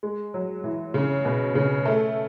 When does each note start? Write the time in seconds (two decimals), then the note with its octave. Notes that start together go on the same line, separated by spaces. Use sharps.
0.03 G#3
0.34 F#3
0.64 E3
0.94 C#3
1.25 B2
1.55 C#3
1.85 A3